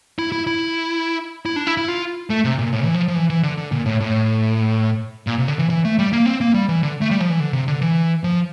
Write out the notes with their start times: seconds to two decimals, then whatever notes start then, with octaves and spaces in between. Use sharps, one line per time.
0.19 E4
0.32 E4
0.47 E4
1.46 E4
1.56 D4
1.67 E4
1.77 E4
1.88 F4
2.30 A3
2.45 C3
2.59 A#2
2.73 A2
2.84 E3
2.94 F3
3.08 F3
3.15 E3
3.30 E3
3.43 D3
3.58 D3
3.72 A#2
3.86 A2
4.01 A2
5.27 A#2
5.39 C3
5.48 D3
5.59 E3
5.70 E3
5.84 A3
5.99 G3
6.13 A#3
6.26 C4
6.41 A#3
6.54 G3
6.69 E3
6.83 D3
7.01 A3
7.11 G3
7.20 F3
7.30 E3
7.40 D3
7.53 C3
7.68 D3
7.81 E3
8.24 F3